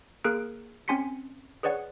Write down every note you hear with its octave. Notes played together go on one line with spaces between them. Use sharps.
A#3 G#4 A#4 F#6 D7
C4 C#4 G#5 C6 B6 C#7
G#4 B4 C#5 D5 F#5